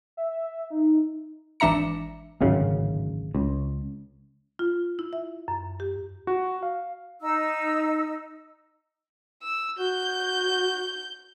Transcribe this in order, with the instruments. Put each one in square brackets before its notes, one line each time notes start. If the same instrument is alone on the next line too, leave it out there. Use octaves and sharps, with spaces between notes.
[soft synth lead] E5
D#4
[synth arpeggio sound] G#1 E3 D4 E5 A#5 C#7
[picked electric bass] D1 G#1 F#2 C#3
C#2
[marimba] F4
E4
E5
F#2
G4
[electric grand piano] F#4
F5
[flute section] D#4 E6
[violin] E6
[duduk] F#4 [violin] G6